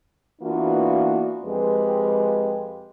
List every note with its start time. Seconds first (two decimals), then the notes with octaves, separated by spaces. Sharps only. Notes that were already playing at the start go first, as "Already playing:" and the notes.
0.42 E3 A#3 B3 D4 F4 F#4
1.45 F2 G#3 G4 G#4 B4